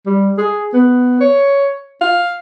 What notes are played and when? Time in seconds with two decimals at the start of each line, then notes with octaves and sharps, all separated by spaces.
0.06 G3
0.38 G#4
0.73 B3
1.20 C#5
2.01 F5